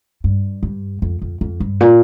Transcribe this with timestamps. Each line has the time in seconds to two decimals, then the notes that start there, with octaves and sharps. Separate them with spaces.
0.24 G2
0.63 G2
1.02 F2
1.22 F2
1.41 F2
1.60 G2
1.81 A#2